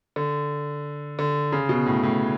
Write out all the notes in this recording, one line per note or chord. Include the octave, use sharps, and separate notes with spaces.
D3
D3
C#3
B2
A2
A2